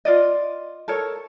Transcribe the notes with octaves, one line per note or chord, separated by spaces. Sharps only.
F4 D5 D#5
A4 A#4 C#5